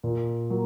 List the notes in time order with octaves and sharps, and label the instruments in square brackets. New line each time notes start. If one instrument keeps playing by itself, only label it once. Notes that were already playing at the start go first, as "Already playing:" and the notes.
[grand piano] A#2
F#3 A#3